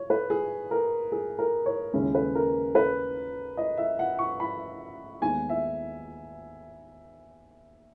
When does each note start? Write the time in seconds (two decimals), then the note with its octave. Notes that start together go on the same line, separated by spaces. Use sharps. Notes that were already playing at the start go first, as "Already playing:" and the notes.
Already playing: C#5
0.10 B4
0.30 G#4
0.71 A#4
1.12 G#4
1.39 A#4
1.66 C#5
1.93 D#2 C#3 G#3 C#4 E4
2.15 B4
2.35 A#4
2.75 B4
3.57 D#5
3.77 E5
3.99 F#5
4.19 C#6
4.40 B5
5.21 D#2 D#3 G#3 B3 D#4 G#5
5.49 E5